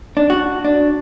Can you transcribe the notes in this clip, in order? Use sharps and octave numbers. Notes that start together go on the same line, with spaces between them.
D4
F#4
D4